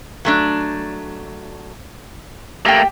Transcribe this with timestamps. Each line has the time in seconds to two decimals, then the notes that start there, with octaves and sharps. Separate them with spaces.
0.25 F#3 A3 D4
2.65 A3 A#3 G4 G5